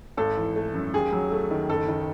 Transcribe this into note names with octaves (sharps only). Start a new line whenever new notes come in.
G#1 A4
E3
A3
F#2
D#2 G#4
F#3
A3
D#3
F#1 A4
D#3